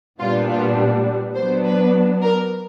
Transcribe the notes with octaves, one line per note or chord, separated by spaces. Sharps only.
A#2 G3 B3 D4 F4
F4
F#3 B3 D4 C5
B4
A#4